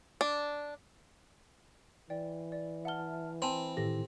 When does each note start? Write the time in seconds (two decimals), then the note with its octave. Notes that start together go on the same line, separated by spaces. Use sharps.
0.21 D4
2.10 E3 D5 G5
2.52 D5
2.85 E5 F#5 A5 F6 G7
3.42 C4 G#5 A5 B5 C6
3.77 A2 D#3 E4 G4 A4 A#6